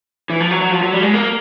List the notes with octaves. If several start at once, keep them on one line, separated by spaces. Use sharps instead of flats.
E3
F3
F#3
F#3
F3
F#3
G3
G#3
A#3